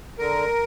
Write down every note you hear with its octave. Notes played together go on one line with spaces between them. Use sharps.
D3 A#4